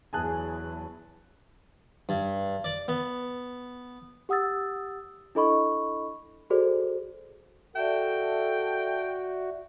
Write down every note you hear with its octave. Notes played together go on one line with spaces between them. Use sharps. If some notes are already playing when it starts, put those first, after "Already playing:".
E2 F#3 G#4 G#5 A5 F#6
G2
D5
B3
G4 F#5 D#6 E6 A6
D4 E4 A4 D#5 B5 C#6
F#4 G#4 A4 C5 D5
F#4 A4 D5 E5 G5